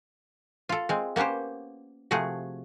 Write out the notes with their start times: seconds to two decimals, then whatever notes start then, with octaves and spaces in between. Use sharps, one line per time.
0.69 F4 A4
0.89 G#3 C4
1.16 A#3 B3 C#4 G4 C5
2.11 C3 F3 A3 F#4 G#4